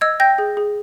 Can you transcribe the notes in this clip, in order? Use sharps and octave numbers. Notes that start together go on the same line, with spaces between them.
D#5 E6 G#6
G5 G6 A#6
G#4
G#4